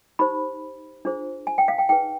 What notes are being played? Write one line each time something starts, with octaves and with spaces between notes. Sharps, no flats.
D#4 G4 C5 B5
D4 F4 G#4 C5
G#5
G5
F5
G5
D#4 G#4 B4 G5